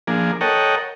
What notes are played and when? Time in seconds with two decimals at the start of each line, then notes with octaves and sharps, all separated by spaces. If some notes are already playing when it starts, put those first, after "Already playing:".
0.07 F3 A#3 D4 G#4
0.41 A4 A#4 C#5 D#5 F#5 G5